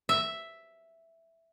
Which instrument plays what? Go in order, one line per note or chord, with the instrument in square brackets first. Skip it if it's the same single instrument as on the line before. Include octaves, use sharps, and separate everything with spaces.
[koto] E5